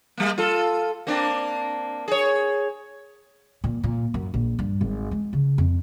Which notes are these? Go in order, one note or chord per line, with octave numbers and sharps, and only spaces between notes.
G3 A#3
F4 A4
A#3 C4 D4
G#4 C#5
A#2
A#2
F#2
A#1
G2
G#1
G#3
C#3
F2